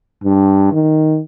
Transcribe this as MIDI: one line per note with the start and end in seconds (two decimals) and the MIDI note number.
0.24 0.70 43
0.72 1.20 51